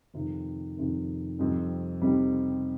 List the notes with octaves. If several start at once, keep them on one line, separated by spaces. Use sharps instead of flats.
F2 C3 D#3
F2 C3 D#3
F2 C3 G3 C4 D#4
F2 C3 G3 C4 D#4